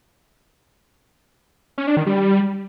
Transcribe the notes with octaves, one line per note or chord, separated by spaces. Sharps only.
C#4
D4
D#3
G3